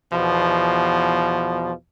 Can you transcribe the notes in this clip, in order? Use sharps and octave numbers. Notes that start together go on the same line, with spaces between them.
E2 B2 F3